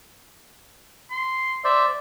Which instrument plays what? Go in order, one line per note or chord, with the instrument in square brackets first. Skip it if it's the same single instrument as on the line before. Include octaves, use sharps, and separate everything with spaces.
[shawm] C6
[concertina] C5 D5 [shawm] E5